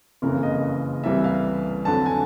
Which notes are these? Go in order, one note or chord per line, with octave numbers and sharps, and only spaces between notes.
F#1 F2 C#3 E3 A#4
D#5
C2 C3 E3 G3 E5
F5
F2 D3 F#3 A5
G#5